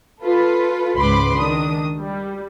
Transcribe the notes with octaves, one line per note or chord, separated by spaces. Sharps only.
F4 A4 B4
C#2 G#2 B4 B5 C6 D6
D#3 D4 D#6
G3